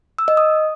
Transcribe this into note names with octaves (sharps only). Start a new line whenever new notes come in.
E6
D#5
D#6